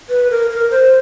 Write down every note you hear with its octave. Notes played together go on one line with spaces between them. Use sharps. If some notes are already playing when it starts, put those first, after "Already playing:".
B4
A#4
A#4
C5